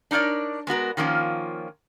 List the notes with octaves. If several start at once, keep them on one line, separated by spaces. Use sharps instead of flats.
D4 D#4 A#4 C#5 D5
G#3 B3 F#4 A#4
D#3 F3 A#3 C#4 F4